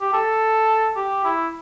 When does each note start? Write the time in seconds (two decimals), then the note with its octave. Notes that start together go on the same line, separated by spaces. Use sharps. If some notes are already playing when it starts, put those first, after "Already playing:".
0.01 G4
0.13 A4
0.96 G4
1.25 E4